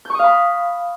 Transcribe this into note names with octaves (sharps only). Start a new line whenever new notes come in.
F5 B5 C#6 D#6 G6